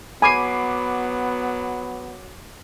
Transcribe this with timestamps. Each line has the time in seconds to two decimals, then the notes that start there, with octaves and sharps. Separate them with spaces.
0.22 F#3 B3 G#5 B5 D6 C7